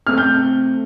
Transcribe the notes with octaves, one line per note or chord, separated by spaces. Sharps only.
C3 A3 C4 F6
G6